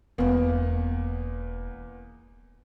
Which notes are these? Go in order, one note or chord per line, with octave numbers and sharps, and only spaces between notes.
E1 E2 A#3 B3 C#4